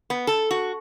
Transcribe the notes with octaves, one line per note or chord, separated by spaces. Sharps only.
B3
A4
F#4